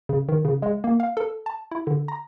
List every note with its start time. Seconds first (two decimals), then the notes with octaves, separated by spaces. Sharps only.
0.09 C#3
0.29 D#3
0.45 C#3
0.62 G#3
0.84 A#3
1.00 F5
1.17 A4
1.46 A5
1.71 E4
1.87 D3
2.08 A#5